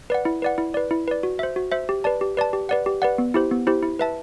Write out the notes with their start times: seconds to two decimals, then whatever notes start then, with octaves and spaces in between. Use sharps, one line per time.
0.10 B4 D5 F#5
0.25 E4
0.42 B4 D5 F#5
0.58 E4
0.74 B4 D5
0.91 E4
1.08 B4 D5
1.23 F#4
1.39 C5 E5
1.56 F#4
1.72 C5 E5
1.89 G4
2.04 B4 D5 A5
2.21 G4
2.37 B4 D5 A5
2.53 G4
2.69 B4 D5 F#5
2.86 G4
3.02 B4 D5 F#5
3.18 B3
3.34 E4 G4 C5
3.51 B3
3.67 E4 G4 C5
3.83 E4
3.99 B4 E5 A5